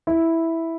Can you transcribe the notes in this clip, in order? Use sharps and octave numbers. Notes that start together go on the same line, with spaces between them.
E4